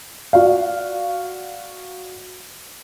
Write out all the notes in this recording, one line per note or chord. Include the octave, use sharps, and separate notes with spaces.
F#4 D5 F5